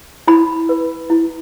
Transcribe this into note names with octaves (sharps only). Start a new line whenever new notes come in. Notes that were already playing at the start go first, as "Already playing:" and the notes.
E4 B5
B4
E4